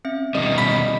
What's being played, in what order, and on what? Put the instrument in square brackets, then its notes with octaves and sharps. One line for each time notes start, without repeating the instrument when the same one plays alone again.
[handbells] C4 C#4 E5
[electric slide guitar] B2 D#3 G3 [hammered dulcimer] D#5
[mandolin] B5